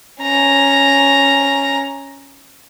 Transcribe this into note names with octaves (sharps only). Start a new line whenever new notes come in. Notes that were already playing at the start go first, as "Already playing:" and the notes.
C#4 A#5